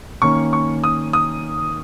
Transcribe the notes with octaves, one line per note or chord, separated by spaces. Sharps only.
D#3 A#3 C#4 C#6
C#6
D#6
D#6